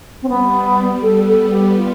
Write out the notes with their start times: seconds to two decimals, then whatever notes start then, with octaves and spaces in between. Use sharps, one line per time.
0.22 C4
0.28 G3 B3
1.02 B3 A4
1.27 A4
1.52 G4
1.77 F4